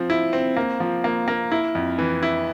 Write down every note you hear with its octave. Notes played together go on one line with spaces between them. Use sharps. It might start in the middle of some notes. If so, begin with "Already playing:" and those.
Already playing: F3 C4
E4
C4
A#3
F3
A#3
A#3
E4
F2
E3
E4